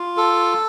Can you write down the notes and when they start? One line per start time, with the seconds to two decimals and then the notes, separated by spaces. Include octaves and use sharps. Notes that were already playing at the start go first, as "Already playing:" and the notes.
Already playing: F4
0.17 A4